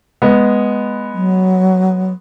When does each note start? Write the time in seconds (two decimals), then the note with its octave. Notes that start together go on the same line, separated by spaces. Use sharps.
0.22 G#3 B3
1.13 F#3